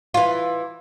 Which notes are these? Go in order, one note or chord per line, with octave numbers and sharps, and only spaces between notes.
E3 F4